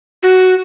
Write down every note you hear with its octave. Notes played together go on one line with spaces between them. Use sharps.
F#4